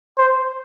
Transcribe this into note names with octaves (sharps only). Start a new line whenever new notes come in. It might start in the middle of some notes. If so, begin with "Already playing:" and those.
C5